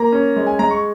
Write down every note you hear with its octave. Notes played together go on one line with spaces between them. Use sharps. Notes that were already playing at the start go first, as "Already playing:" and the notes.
Already playing: A#3 A#5
C#4
G#3
G#5
G#3 A#5
C#6